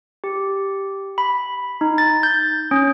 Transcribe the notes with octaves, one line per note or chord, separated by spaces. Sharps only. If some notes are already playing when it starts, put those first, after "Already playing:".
G4
B5
D#4
A6
G6
C#4